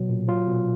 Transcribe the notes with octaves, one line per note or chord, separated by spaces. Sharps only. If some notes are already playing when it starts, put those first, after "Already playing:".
Already playing: B2 F#3
A#2
F#3 F4
B2